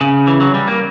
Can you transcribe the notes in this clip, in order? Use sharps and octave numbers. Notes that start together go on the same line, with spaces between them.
C#3
E3
F#3
G3
A#3